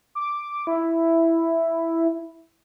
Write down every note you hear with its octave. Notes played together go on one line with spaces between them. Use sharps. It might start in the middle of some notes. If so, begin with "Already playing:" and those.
D6
E4